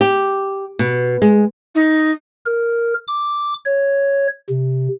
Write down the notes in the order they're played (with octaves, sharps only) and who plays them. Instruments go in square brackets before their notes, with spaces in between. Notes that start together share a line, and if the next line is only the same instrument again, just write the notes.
[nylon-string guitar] G4
B2
G#3
[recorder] D#4
[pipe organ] A#4
D6
C#5
C3